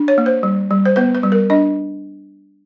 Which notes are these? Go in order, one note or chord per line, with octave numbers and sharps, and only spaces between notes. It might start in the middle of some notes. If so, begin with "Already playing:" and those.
Already playing: D4
C#5
A#3
C5
G3
G3
C5
B3 B4
B4
G3
A#4
D4 D#5